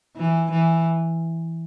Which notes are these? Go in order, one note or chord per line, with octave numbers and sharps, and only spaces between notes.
E3
E3